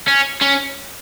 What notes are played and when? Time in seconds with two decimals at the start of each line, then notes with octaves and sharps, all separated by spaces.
0.08 C#4
0.42 C#4